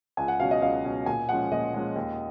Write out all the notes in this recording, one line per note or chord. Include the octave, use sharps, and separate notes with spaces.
C#2 G#5
F#5
B2 F#3 C#4 F5
D#5
C#2 F5
B2 F#3 C#4
A#2 G#5
F3 G#3 C#4 F#5
A#2 D#5
F3 G#3 C#4
D#2